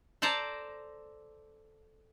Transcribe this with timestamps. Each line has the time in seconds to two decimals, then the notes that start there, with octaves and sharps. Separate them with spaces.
0.22 A4 C5 D5 A5 A#5